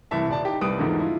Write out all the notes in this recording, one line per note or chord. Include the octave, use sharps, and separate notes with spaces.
C2 E3 E5 A5
D#1 D5 A5
D#4 G4
C2 G3 B4 D#6 D7
E2 G#2 D3 F3 A#3
E4 F4